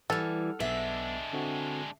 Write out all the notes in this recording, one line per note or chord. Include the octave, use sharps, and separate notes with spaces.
E3 G3 A4 F#5 F6
B1 G#3 B3 D4 E5 E6
D3 C4 F#4